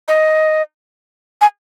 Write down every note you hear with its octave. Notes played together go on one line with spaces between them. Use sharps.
D#5
G#5